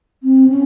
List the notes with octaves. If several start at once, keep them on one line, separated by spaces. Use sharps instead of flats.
C4
C#4